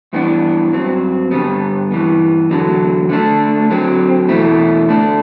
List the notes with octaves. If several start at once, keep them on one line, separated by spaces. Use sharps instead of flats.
G2 E3 B3 D4
G2 F#3 C4
G2 D3 G3 B3
G2 E3 B3
E2 D3 F#3
D3 A3 D4
D3 F#3 C4
E2 B2 A3 E4
D3 A3 D4